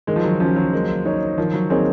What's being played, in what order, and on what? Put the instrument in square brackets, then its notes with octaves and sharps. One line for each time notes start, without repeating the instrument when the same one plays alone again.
[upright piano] D#3 [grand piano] G#3
[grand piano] F3
F#3
[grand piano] F3 [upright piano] F#3 C#4
[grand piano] F#3
[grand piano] G#3 [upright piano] A#3
[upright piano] D#4 A#4 C#5
[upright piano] D#3 [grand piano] F3
[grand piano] F#3
[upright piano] A#3 D#4 G#4 C#5 [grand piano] C4